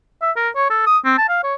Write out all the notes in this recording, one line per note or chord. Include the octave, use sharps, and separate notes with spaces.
E5
A#4
C#5
A4
D#6
C4
A5
F5
C#5